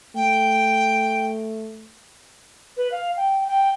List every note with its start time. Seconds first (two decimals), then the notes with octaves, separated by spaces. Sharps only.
0.16 A3 G5
2.77 B4
2.92 F5
3.17 G5
3.48 G5